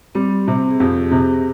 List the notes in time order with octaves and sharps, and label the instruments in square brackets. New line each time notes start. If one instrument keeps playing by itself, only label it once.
[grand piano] G3 [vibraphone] C4
[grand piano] C3
[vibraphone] G#4
[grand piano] F2 [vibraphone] G4
[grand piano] C3